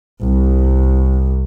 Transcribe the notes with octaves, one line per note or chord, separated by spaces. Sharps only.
C2